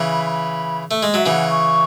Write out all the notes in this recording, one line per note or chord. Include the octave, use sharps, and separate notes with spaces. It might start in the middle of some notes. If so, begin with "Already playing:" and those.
Already playing: C#3 E3 B5
B5
A3
G#3
F#3 E5
C#3 E3 F#5
C#6